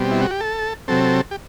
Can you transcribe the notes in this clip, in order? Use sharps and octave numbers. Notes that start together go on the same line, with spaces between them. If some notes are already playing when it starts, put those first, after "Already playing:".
Already playing: B2 G3 C4
E4
F#4
G4
A4
C3 F#3 C4 A4
G4